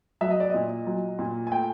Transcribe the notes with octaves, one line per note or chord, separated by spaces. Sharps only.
F#3 E5
D#5
D5
A#2 D#5
F#3
A#2
G#5
A3 G5